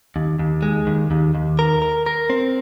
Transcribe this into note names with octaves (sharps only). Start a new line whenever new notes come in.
D#2
D#2
G#3
D#2
D#2
D#2
A#4
A#4
A#4
C4